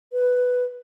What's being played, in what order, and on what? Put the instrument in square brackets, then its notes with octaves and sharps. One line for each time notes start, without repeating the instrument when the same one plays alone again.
[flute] B4